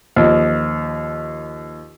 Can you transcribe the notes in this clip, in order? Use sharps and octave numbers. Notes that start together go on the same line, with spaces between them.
D#2 F3